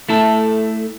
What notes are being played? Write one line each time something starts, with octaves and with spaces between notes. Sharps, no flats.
A3 E4 A4